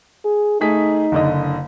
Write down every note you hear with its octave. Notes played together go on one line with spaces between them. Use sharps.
G#4
A3 D#4 G#4 B6
F#1 D3 D#5